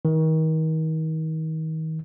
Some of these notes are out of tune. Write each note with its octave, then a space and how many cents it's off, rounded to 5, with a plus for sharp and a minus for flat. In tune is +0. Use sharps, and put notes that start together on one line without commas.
D#3 +30